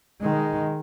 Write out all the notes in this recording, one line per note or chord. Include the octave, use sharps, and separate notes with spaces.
D#3 G#3